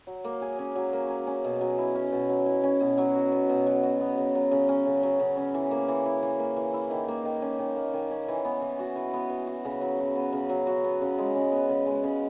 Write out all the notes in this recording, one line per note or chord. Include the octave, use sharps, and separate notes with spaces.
F#3
A#3
G#4
C#4
F#3
A#3
G#4
C#4
B2
F#3
E4
C#4
B2
F#3
E4
C#4
B2
F#3
F#4
B3
B2
F#3
F#4
B3
C#3
F#3
C#3
C#4
C#3
F#3
C#3
C#4
E3
A#3
E3
E4
E3
A#3
E3
E4
D#3
A#3
D#3
C#4
D#3
A#3
D#3
C#4
E3
B3
E3
F#4
E3
B3
E3
F#4
C#3
F#3
F#4
B3
C#3
F#3
F#4
B3
C#3
G#3
C#3
B3
C#3
G#3
C#3